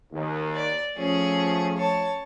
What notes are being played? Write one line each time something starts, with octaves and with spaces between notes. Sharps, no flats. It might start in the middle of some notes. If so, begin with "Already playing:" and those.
D#2
D5
F3 A3 C#4 G#4
C#5 A5